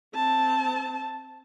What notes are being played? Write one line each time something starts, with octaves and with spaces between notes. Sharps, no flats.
C4 A5